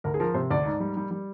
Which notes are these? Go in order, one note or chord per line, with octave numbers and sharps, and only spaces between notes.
D2 A#4
G#4
F3 A#4
C3 C5
D2 D5
G#2
G3
G3
G3